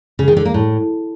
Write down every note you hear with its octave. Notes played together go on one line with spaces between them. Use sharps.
C#3
D#3
D3
A#3
A2